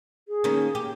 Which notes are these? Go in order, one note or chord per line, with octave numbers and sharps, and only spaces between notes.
G#4
D#3 A#3 C#4
G4